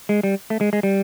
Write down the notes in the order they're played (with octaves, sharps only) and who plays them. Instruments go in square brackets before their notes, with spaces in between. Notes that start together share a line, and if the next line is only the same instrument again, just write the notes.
[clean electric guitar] G#3
G3
A3
G#3
G#3
G3